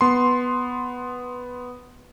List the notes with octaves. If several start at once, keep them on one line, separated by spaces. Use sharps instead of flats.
B3 C6